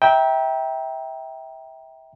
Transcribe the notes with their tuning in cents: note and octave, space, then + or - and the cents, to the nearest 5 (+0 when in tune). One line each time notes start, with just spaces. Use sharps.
E5 -25 G5 +0 A#5 +20